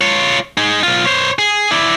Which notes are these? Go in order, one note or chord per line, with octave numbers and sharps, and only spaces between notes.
F4 C#5
D#4 G#4
B1 F4
C5 C#5
G#4
E4 D5